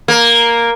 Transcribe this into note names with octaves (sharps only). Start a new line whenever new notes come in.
A#3